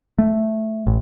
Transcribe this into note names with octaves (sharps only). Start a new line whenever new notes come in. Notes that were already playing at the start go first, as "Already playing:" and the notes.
A3
A1